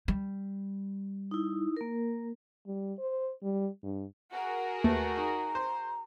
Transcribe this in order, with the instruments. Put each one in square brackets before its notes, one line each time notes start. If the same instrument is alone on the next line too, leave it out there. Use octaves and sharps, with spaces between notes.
[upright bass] G3
[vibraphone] D#4 E4
A#3 A#4
[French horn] G3
C5
G3
G2
[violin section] F#4 G#4 A#4 [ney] F#5
[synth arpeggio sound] D#2 [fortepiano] A3 [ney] B4
[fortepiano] D#4 [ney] A#5
[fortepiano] C5